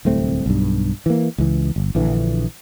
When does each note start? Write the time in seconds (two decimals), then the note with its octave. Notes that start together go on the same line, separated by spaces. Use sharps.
0.05 D1 C2 A3 C4
0.46 B1 G2
1.06 E3 A#3
1.38 C#2 E3
1.76 G1
1.95 A#1 D3 E3